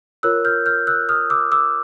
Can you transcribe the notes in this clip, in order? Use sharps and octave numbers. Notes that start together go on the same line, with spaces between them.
F4 A#4 C#5 E6 F#6
F6 G6
F6 G6
E6 F#6
D#6 F6
D6 E6
D6 E6